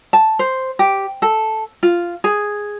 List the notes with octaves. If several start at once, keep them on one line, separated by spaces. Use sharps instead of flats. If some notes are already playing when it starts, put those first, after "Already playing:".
A5
C5
G4
A4
F4
G#4